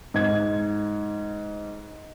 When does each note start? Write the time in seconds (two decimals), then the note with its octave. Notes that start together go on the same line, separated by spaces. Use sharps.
0.14 G#2 G#6